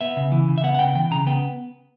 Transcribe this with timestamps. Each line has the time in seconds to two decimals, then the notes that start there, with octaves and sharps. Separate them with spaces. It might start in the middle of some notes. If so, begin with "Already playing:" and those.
0.01 B3 E5
0.17 C#3
0.32 E3
0.49 C#3
0.58 E5
0.64 B3 F#5
0.75 F#5
0.79 C#3 G5
0.95 E3 G5
1.11 C#3 A#5
1.27 B3 G5